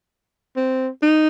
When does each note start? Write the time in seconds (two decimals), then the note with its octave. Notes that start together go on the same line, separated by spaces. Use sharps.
0.56 C4
1.02 D#4